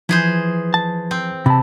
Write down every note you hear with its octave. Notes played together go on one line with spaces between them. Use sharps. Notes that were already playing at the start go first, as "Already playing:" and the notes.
E3 F3 G#4 C5
A5
C4
C3 A5 B5